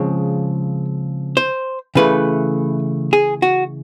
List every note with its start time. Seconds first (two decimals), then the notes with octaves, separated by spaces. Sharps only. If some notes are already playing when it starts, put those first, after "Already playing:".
Already playing: C#3 F3 G#3 C4 C#5
1.37 C5
1.95 C#3 E3 A3 B4
3.13 G#4
3.42 F#4